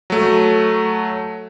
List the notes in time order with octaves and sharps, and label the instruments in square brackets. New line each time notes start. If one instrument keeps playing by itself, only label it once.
[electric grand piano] F#3 A3